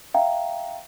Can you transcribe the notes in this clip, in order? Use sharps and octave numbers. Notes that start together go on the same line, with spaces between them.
E5 F5 G5 A#5